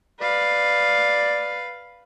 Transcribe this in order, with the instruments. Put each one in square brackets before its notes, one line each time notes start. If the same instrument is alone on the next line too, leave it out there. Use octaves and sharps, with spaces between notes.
[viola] B4 F5 [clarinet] D5